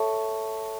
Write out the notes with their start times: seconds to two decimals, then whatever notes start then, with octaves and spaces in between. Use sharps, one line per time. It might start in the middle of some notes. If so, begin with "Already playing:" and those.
Already playing: A4 C#5 E5 A5 C#6